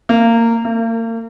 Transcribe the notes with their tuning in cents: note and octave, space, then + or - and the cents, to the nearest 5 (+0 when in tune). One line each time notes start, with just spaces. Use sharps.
A#3 -20
A#3 -40